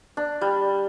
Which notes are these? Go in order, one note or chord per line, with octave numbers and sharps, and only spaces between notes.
D4
G3